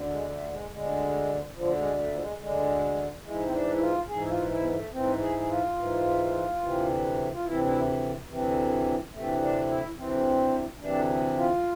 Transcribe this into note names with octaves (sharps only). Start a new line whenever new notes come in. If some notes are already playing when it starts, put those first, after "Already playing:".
Already playing: D2 D3
G#3
A3
G#3
D2 D3 G#3
D2 D3 F3
G#3
A3
F3
G#3
D2 D3 G#3
G#2 E3 G#3
C4
D4
E4
F4
G#2 E3 G#4
E4
F4
E4
B3
A3
G#2 E3 C4
G#4
G#4
F4
G#2 E3
D2 C3 E3
F4
D2 C3 E3 E4
E4
D2 C3 E3
D2 C3 E3 A3
D4
E4
D2 C3 E3 C4
D2 C3 E3 D4
F4